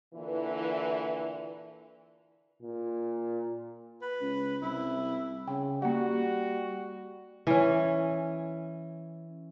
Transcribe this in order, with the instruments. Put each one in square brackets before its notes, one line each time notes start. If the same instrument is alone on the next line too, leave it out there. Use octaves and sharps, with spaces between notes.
[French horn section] A#2 D3 E3
[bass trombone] A#2
[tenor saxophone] B4
[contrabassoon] C#2
[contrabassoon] C2 [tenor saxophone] E4
[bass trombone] C#3 [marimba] G5
[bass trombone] G3 [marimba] A#3 F#5 [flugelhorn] F#4
[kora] E3 C#4